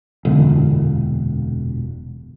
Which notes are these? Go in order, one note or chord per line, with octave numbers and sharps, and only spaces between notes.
E1 F#2 A#2 D3